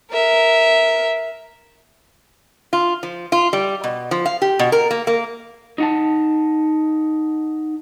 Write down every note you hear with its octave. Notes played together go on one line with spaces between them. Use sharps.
A#4 E5
F4
F3
F4
G3
B2
F3
F5
G4
B2
A#4
A#3
A#3
D#4 F#5 A5